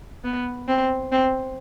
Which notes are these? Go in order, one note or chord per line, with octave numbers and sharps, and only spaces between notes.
B3
C4
C4